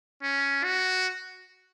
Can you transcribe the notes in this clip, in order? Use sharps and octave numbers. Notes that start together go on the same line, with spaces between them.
C#4
F#4